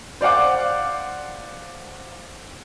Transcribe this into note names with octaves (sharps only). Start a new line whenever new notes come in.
C5 D5 F5 F#5 D6